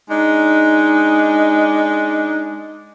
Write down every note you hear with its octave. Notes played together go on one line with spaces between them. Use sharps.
G#3 D4 D#4